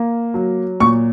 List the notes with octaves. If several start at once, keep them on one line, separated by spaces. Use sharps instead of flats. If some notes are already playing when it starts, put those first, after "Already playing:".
Already playing: A#3
F#3
A#2 C#6